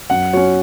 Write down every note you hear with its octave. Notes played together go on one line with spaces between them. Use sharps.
F#2 F#5
F#3 C#4 C#5